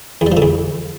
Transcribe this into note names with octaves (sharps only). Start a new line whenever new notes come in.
E2
G3
F3
D3
E2